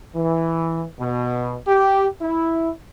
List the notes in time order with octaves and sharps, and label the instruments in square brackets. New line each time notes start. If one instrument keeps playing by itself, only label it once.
[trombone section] E3
B2
G4
E4